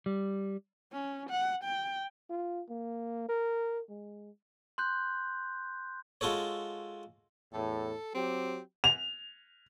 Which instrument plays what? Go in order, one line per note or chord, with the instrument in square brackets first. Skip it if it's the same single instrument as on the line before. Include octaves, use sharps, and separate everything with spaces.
[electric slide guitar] G3
[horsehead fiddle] C#4
F#5
G5
[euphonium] F4
A#3
A#4
G#3
[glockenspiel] C6 F#6 G6
[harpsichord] G#3 F4 F#4 A4 C#5
[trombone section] E2 A2 [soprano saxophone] A4
[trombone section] F#3 G4 [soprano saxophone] C4
[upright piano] F7